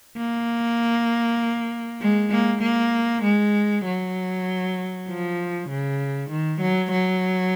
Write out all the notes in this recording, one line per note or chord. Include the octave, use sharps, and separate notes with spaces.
A#3
G#3
A#3
A#3
G#3
F#3
F3
C#3
D#3
F#3
F#3